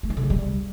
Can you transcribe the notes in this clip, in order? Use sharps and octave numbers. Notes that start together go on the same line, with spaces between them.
A3
E3
D3
C#3
G3